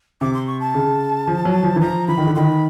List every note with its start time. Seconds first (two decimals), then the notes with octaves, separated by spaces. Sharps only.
0.21 C3 D6
0.34 C6
0.47 C#6
0.60 A5
0.74 C#3
1.27 F3
1.45 F#3
1.63 F3
1.76 E3
1.81 F3 A#5
2.08 E3 B5
2.18 D#3
2.27 D3
2.35 D#3 B5 C6